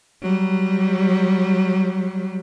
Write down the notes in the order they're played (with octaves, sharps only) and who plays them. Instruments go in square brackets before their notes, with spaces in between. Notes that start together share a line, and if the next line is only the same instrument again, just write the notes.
[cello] F#3 G3